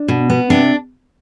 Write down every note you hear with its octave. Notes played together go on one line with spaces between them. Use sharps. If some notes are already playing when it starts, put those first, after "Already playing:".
Already playing: D4
B2
B3
C3 D4